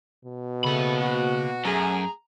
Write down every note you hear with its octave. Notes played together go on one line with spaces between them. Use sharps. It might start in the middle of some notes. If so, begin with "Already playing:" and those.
B2
C#3 A3 A#3 B5
F#4
F#2 A3 G#4 A#5